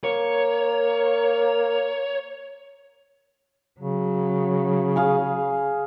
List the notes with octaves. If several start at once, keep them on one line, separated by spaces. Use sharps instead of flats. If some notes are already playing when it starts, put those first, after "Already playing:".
A#3 C#5
C#3 F#3
G#4 F5 G#5